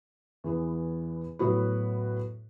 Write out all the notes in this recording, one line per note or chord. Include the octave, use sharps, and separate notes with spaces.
E2 E3 B3
A2 F#3 B3 F#4 B4